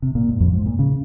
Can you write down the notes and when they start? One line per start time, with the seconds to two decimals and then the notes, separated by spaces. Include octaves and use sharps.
0.02 C3
0.15 A#2
0.28 G#2
0.40 F2
0.53 G#2
0.66 A#2
0.79 C#3